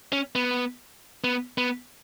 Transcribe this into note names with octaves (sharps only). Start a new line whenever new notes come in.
C#4
B3
B3
B3